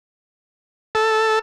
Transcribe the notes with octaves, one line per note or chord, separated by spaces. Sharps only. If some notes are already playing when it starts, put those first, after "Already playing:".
A4